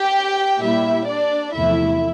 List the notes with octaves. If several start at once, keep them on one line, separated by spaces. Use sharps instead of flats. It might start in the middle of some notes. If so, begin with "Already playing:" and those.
Already playing: G4 G5
A#2 G3 A#3 E4 E5
D4 D5
E2 C3 F3 A3 E4 E5